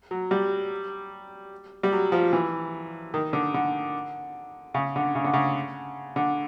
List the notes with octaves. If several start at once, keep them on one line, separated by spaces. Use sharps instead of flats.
F#3
G3
G3
F#3
F3
E3
D#3
D3
D3
C#3
D3
C#3
D3
C#3
D3